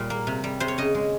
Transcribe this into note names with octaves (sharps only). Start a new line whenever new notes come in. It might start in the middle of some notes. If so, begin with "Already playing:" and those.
Already playing: A#2 G3
A#3
C3
G3
C3 C5
C#5
C#3 D#5
G#3